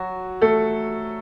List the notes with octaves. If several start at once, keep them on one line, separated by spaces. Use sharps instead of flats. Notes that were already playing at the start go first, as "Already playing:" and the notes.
Already playing: F#3 F#4
A3 A4